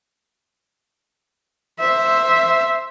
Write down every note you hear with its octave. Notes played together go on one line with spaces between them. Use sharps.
C5 E5